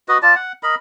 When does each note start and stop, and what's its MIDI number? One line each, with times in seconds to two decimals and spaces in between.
0.08 0.18 66
0.08 0.18 71
0.08 0.18 75
0.22 0.35 65
0.22 0.35 74
0.22 0.35 81
0.35 0.52 78
0.63 0.75 70
0.63 0.75 75
0.63 0.75 83